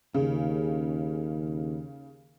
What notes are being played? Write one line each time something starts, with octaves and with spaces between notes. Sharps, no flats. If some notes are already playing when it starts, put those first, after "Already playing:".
D#2 C#3